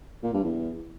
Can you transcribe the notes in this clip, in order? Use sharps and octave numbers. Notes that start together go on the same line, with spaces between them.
A#2
G2
E2